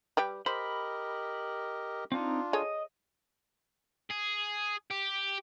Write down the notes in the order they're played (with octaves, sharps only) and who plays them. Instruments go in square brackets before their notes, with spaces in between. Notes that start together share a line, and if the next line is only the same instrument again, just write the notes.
[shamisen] G3 G4 B4
[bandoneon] G4 A#4 D#5 [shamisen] C5 [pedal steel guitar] B5
[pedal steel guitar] C4 D#4 [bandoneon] D4 F4
[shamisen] G#4 A4 C#5 [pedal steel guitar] D#5
[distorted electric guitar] G#4
G4